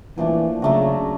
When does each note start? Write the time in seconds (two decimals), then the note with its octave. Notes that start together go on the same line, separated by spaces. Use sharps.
0.17 A#2 E3 F3 A3 D4
0.62 C#3 F#3 A3 D4 F#4